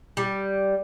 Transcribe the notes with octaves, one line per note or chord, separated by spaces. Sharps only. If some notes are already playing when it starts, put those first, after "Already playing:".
G3